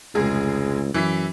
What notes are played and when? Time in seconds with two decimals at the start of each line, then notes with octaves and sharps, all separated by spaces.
0.15 F1 C#2 G#3 G#4
0.94 F#2 E3 B6